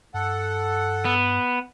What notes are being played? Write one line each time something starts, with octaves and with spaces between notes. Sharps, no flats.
G2 A4 F#5
B3